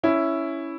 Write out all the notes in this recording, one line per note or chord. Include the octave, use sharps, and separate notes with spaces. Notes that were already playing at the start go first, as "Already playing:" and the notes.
C#4 E4